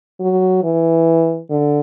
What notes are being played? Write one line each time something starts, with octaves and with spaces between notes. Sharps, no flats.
F#3
E3
D3